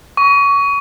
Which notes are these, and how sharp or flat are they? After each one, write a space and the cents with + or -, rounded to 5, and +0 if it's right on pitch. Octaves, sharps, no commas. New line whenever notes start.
C#6 +25